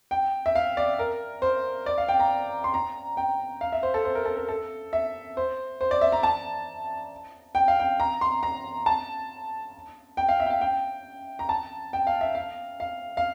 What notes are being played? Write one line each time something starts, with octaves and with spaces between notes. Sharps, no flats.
G5
E5
F5
D5
A#4
C5
D5
F5
G5
A#5
C6
A#5
G5
F5
E5
C5
A4
C5
A#4
A4
A#4
A4
E5
C5
C5
D5
E5
A#5
A5
G5
F5
G5
A#5
C6
A#5
A5
G5
F5
E5
G5
F5
G5
A#5
A5
G5
F5
E5
F5
F5
F5